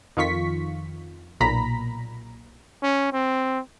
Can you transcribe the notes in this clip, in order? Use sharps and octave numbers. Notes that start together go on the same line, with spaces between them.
F2 D#3 F4 C#6 B6
B1 A#2 A#5 B5 B6
C#4
C4